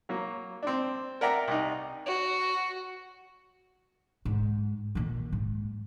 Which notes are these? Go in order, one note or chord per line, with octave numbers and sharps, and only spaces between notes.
F#3 A#3
C4 D4
A#4 D5 E5 F#5 G5 A#5
C2 D#4
F#4
G#2
A#2 D#3
G#2